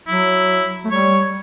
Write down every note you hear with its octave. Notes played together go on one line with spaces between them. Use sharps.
F#3 E4
A3
G3 C#5